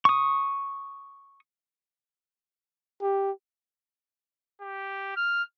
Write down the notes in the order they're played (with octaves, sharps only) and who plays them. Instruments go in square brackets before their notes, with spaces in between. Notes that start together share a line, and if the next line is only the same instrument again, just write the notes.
[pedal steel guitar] C#6 D#6
[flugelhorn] G4
[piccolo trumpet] G4
F6